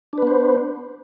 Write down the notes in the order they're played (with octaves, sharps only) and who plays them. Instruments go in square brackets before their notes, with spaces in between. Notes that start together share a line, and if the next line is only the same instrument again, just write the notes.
[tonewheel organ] D4
B4
B3
C5